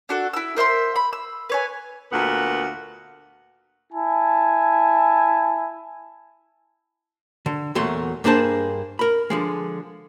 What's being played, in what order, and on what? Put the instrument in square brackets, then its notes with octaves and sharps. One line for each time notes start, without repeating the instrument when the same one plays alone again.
[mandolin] D4 F#4 A4
E4 E6
A#4 C5 E5 C6
B5
E6
B4 C#5 G#5
[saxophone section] D2 A#2 B3 A#4 F#5
[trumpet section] E4 G#5 A5
[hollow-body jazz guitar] D3
E2 A#2 F#3 A3 C6
G2 A#3 D4 G#4 C5 A5
A#4 B5
D3 F3 G#3